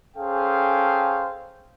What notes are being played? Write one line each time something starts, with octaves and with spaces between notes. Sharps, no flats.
C#4 G#4 A4 C5 F5 G5